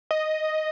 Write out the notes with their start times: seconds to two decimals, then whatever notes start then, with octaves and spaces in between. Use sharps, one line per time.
0.11 D#5